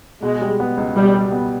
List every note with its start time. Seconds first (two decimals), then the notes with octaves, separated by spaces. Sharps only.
0.22 B2 G#3
0.42 G3
0.60 B3
0.77 C#2
0.96 B2 G3
1.14 G3
1.32 B3